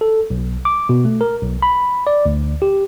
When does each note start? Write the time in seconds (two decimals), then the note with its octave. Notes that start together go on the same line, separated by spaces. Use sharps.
0.01 A4
0.30 B1
0.65 D6
0.89 B2
1.05 A3
1.21 A#4
1.42 B1
1.62 B5
2.07 D5
2.26 D2
2.62 G4